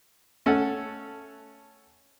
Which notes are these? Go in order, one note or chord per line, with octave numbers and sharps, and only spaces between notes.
A3 C#4 A4 F#5